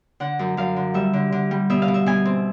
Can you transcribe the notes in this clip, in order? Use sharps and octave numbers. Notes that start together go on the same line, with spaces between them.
D3 F#5
F#2
F#2 F5
D3
G3 E5
D3
D3
G3
B2 E5
F5
B2
E5
B2 G#5
C4